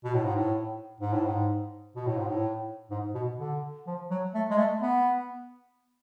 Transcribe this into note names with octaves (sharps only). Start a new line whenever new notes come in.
B2
A2
G#2
A2
G#2
A2
G#2
B2
A2
G#2
A2
G#2
B2
D3
F3
F#3
A3
G#3
A3
B3